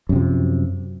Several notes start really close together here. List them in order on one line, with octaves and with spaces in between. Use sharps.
F#2 C3 F3